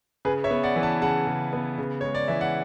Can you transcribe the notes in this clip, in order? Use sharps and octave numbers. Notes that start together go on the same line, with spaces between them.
C#3 G#4 B4
C#5 E5
B3
D5 F#5
E3
F#5 A5
C#3 F#5 A5
C#3
B3
C#3
G#3 C#5
D5
E3 E5
F#5